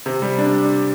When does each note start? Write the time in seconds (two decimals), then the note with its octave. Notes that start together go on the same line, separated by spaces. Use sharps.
0.06 C3
0.22 G3
0.38 D4